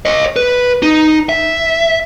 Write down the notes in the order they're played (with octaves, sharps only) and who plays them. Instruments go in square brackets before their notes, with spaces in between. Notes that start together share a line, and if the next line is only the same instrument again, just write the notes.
[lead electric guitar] C#5 D#5
B4
D#4
E5